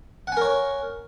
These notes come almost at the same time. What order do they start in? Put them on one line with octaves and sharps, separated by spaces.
F#5 G#5 A#4 C#5